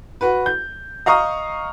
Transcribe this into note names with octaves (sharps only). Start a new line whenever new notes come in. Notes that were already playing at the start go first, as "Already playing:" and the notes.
F#4 B4
G6
D#5 F5 A#5 C#6 D#6